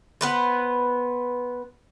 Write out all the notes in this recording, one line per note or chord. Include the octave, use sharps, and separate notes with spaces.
B3 B4 C5